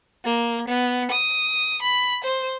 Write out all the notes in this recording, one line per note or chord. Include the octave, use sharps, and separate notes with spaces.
A#3
B3
D#6
B5
C5